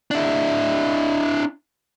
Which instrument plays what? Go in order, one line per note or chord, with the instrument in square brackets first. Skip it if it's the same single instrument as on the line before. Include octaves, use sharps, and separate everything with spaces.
[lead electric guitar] D4 E4